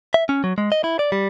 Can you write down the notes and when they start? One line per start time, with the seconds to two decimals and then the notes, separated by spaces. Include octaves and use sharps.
0.14 E5
0.29 C#4
0.44 F#3
0.58 G#3
0.72 D#5
0.84 E4
0.99 D5
1.12 G3